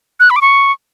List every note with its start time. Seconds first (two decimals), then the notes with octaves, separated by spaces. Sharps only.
0.20 F#6
0.30 B5
0.36 D6
0.41 C#6